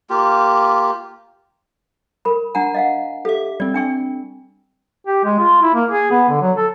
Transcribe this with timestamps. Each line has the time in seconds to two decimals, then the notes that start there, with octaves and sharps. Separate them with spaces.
0.10 A#3 F4 G4
2.25 A#4 B5
2.55 D4 F#5 G#5 A#5
2.74 D#5 F5 F#5
3.25 G4 A4 E5
3.60 G3 C4 D5
3.74 D4 G5 C#6
5.07 G4
5.25 G#3
5.39 F4
5.62 E4
5.74 A#3
5.91 G#4
6.11 B3
6.29 D3
6.42 F#3
6.57 A4